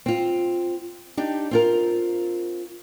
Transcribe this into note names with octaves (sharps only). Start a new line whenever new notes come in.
C4 F4
D4 D#4 G4
C4 F4 A#4